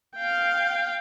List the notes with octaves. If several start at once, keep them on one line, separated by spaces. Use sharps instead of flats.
F5 G5